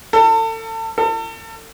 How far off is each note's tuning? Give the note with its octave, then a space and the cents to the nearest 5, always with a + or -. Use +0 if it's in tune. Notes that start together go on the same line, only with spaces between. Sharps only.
A4 +35
A4 +40